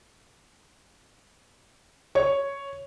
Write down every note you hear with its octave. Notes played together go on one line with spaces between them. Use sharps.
C#5